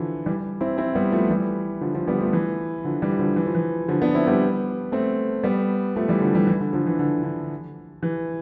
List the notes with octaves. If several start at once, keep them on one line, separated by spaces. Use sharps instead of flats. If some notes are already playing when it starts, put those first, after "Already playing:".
Already playing: D3 E3 F3
E3 G3
C4 E4
C4 E4
G3 B3
F3 A3
E3 G3
D3 F3
D3 F3
G3 B3
F3 A3
E3
D3 F3
E3 G3
D3 F3
E3
F3
E3
D3 F3
B3 D4
C4 E4
G3 B3
A3 C4
G3 B3
F3 A3
E3 G3
D3 F3
E3 G3
E3
D3
D3 F3
E3
D3
D3
E3